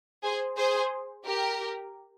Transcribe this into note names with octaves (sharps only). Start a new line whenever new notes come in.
G#4 C5
G#4 C5
G4 A#4